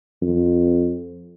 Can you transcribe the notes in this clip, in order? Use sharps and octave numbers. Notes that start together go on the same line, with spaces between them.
F2